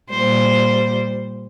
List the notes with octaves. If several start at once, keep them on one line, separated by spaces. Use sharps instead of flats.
A#2 G3 C5